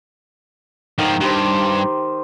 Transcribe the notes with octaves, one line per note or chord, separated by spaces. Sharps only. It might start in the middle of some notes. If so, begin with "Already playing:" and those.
G#2 D#3 F3
G2 G4 C5